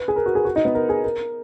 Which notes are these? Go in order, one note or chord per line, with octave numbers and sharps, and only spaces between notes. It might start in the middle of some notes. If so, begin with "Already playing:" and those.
Already playing: B4
G#4
A#4
F#4
G#4
F#4
D#4
B3
A#4
G#4
A#4